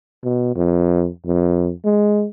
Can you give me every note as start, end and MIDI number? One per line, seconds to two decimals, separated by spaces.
0.23 0.51 47
0.56 1.08 41
1.26 1.71 41
1.85 2.26 56